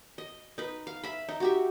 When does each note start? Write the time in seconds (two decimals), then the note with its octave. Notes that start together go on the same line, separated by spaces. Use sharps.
0.18 D#5
0.58 D#4 B4
0.87 F5
1.03 E5 B5
1.29 D#4
1.40 F#4 G4 E5